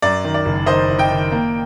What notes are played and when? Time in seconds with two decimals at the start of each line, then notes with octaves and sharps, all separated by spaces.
0.02 F#2 D5
0.24 D#3
0.34 D5
0.45 F#1
0.66 D#3 C5 D#5
0.89 F#1
0.99 D#5 G5
1.10 D#3
1.32 A#3